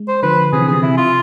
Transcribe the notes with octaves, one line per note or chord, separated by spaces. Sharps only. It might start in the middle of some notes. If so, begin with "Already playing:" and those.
Already playing: G#3
C5
D3 F3 B4
C3 E3 G#4
D3
C3 G#4
E4
F4